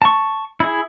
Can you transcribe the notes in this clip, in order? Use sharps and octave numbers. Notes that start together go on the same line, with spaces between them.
A5 C#6
E4 G#4